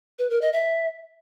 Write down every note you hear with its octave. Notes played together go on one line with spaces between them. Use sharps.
B4
A#4
D#5
E5